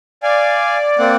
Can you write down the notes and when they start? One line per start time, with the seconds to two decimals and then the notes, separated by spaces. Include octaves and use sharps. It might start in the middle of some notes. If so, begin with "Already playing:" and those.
0.23 D5 F5 G#5
0.99 A#3 C4 F#5